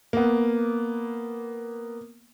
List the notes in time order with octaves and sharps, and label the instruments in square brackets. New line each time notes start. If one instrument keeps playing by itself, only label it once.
[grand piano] A#3 B3